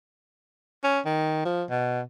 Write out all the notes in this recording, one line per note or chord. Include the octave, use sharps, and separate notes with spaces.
C#4
D#3
F3
B2